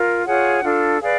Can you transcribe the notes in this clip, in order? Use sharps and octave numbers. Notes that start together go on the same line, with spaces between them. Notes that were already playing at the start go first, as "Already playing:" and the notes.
Already playing: F4 A#4
F4 G#4 C#5 F#5
D4 F4 A4
G#4 B4 D5 F5